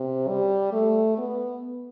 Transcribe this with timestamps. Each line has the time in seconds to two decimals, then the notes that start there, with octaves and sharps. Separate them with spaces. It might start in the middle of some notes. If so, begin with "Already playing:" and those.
Already playing: C3
0.28 G3
0.73 A3
1.18 B3